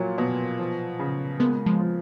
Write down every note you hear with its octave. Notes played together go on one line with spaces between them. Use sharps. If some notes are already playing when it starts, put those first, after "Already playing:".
Already playing: A#2 F#3
B2
F3
C#3
G#3 A#3 B3
F3 G#3
F3